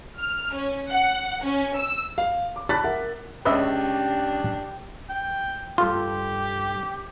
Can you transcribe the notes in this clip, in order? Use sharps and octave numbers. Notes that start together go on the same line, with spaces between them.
F6
C#4
F#5
C#4
E6
F5
D6
A5 B5 F#6 A6 B6
A#4 E5 F#5
C#2 C#3 D4 G4 B4 C#5 D#5 E5
G5
G2 F4 G4 A4 C6